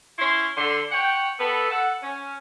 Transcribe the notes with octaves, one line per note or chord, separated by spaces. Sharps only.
C#4 E4 C6
D3 C6
C#5 F#5 G5
B3 A4
A4 F#5
C#4